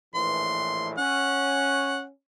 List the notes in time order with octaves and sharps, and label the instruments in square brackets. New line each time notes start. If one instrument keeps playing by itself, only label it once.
[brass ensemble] A#1 A2 E3 [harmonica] C6
[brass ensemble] C#4 [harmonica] F#5